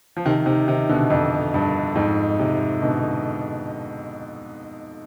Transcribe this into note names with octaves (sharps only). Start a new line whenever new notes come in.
F3
C3 D#3
C3 D#3
C3 D#3
B2 D3
F2
G2
F2 G#2
G#2 C3
B2 D3